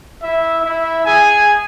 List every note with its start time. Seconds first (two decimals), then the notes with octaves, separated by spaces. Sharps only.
0.22 E4 E5
0.64 E4 E5
1.06 G#4 G#5